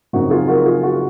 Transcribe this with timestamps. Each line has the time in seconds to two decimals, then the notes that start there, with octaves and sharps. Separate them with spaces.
0.13 F#1 F#2 F3 C4 D#4 F#4
0.30 F4 G#4
0.48 F#4 A#4
0.66 F4 G#4
0.83 F#4